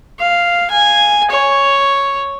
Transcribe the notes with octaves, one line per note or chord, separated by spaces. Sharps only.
F5
G#5
C#5